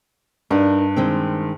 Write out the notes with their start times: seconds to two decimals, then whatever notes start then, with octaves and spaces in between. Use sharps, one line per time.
0.51 G2 D4 D#4 A#4
0.96 D#3 G#3 C4